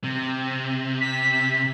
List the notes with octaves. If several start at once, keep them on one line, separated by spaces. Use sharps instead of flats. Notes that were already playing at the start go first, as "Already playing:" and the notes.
C3
B6